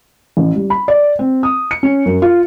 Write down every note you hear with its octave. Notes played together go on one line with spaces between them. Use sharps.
A1
G3
B5
D5
C4
D#6
C#7
C#4
F#2
F4